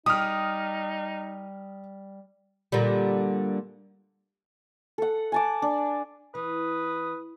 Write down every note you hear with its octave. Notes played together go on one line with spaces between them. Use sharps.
G3 D#4 D#6 F6
A#2 D3 G3
A4 F#5
G#5 A5 D6
D4
E3 B4 D#6